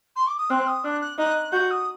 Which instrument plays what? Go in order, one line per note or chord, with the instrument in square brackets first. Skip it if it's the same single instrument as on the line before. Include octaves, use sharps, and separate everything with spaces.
[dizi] C6
D6
D#6
[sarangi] C4 [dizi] F#6
[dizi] D#6
[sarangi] D4 [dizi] F#6
[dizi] F#6
[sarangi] D#4 [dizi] F#6
[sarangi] F#4 [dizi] G6
[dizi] D#6